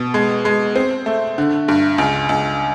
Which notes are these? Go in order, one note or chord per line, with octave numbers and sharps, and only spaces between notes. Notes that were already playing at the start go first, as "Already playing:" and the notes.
Already playing: B2
G#3
G#3
C4
A3
D3
G2
C#2
C#2